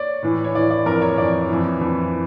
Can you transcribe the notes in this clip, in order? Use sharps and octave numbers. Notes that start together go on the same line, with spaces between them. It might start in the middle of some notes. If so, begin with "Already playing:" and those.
Already playing: C#5 D5
A2 E3
C#5
A2 E3 D5
D5
F2 E3 A#4
C#5
F2 E3 D5
F2 E3
F2 E3